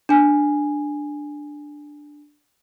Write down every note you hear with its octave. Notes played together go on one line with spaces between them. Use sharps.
D4 G#5